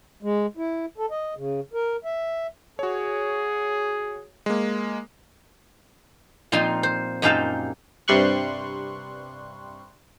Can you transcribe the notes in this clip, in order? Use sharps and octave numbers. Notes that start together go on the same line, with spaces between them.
G#3
E4
A4
D#5
C#3
A#4
E5
F#4 G#4 C#5
G#3 A#3
A#2 F3 C4 D#4 F4 C6
C5
F#2 A#2 D#4 G4 F5 A5
G2 C3 G3 C6 C#6 F#6